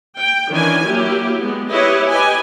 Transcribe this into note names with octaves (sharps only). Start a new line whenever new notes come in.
G5
D#3 E3 C#4 D4 G#5
F#3 A#3 E4 G4
G#3 B3
E4 G4 B4 C#5 D#5
G4 B4 D#5 G#5